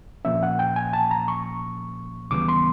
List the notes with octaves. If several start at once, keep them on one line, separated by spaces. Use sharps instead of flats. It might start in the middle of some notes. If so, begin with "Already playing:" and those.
A#2 F3 A#3 C#4 E5
F#5
G5
G#5
A5
A#5
C#6
D#2 C#3 E3 G3 B3 D6
C6